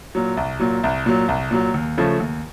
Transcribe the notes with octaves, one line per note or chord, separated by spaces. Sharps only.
A#2 F#3
C2
A#2 F#3
C2
A#2 F#3
C2
A#2 F#3
D#2
C#3 F3 A3
D#2